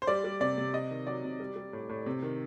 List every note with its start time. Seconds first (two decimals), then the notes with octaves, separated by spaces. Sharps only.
0.02 C5
0.07 G3 D5
0.24 G3
0.40 C3 D5
0.58 C3
0.74 C3 D#5
0.91 D#3
1.07 F#3 D5
1.24 C3
1.40 G3
1.56 G3
1.73 A2
1.89 A2
2.06 C3
2.23 D#3